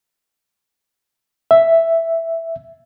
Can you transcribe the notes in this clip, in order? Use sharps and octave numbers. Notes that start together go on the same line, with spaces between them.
E5